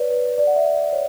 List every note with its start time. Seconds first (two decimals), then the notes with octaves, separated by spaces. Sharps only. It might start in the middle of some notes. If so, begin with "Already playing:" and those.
Already playing: B4 C#5 D5
0.10 B4
0.38 D5
0.47 F#5
0.56 E5
0.73 E5
0.92 C#5